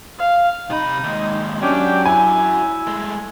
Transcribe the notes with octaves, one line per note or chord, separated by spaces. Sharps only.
F5
C3 D#4 B5 D#6
D#2 G#3
F#2 F#3 C#4 D4 G4 G5
E4 G#5
G#3 A3